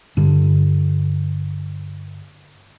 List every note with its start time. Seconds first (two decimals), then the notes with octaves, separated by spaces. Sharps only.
0.17 G2 D3